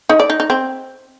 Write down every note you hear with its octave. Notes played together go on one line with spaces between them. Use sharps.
D#4
D5
D#4
D#4
C4